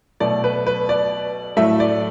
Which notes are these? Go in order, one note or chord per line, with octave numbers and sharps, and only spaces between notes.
B2 F#3 A3 D5
B4
B4
D5
A2 F#3 A3 E5
D5